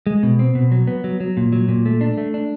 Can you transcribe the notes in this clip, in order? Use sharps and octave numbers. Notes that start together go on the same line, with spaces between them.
G#3
B2
C4
B2
F#3
B3
F#3
F#3
A#2
F#3
A#2
A3
D4
A3
D4